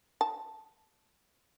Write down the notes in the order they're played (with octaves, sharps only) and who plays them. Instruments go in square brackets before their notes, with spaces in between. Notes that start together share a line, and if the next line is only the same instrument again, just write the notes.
[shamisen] A5